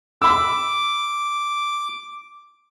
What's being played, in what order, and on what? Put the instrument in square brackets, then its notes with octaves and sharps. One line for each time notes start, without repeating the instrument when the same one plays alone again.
[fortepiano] B5 E6 [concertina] D6